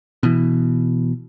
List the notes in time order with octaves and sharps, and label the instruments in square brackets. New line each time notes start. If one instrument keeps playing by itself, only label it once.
[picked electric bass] B2 E3